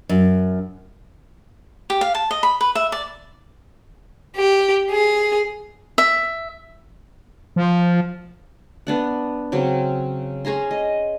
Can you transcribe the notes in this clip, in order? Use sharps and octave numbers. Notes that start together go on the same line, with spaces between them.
F#2
G4
F5
A5
D#5
B5
B4
E5
D5
G4
G#4
E5
F3
B3 D4 F#5
C#3 F#3 C4
C#4 G#4 A#5 C6
D#5